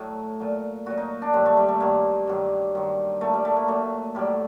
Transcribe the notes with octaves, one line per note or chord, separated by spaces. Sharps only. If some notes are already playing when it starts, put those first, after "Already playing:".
Already playing: A2 F#3
A#2 F#3
A#2 F#3 F#4
D#4
D4
G2 D#3 F#3
A3
G3
A3
G2 D#3 F#3 A#3
G2 D#3 F#3
G2 D#3 F#3
A#2 F#3 A3
G3
A3
A#3
A#2 F#3 A3
A2 F#3 G3